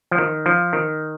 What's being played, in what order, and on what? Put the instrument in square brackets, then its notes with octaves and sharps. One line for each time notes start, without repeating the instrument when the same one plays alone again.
[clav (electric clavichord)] F3
D#3
F3
D#3